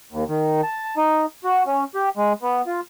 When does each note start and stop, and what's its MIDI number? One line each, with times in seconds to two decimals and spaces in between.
0.12 0.24 39
0.28 0.61 51
0.63 0.95 81
0.97 1.26 63
1.44 1.63 66
1.67 1.84 61
1.95 2.09 67
2.17 2.33 56
2.42 2.62 59
2.67 2.80 65